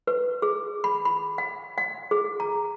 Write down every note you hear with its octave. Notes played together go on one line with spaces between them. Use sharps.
B4
G#4
B5
B5
F#5
F#5
G#4
A#5